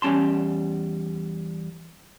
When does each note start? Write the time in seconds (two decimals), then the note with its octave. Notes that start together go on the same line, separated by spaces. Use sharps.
0.02 E2 G3 C#4 A5 C6